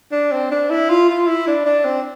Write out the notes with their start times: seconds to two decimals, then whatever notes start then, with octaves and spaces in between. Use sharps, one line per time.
0.12 D4
0.32 C4
0.51 D4
0.70 E4
0.90 F4
1.09 F4
1.27 E4
1.47 D4
1.66 D4
1.85 C4